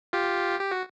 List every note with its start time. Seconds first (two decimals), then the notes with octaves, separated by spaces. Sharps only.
0.13 F4 G4
0.60 G4
0.71 F#4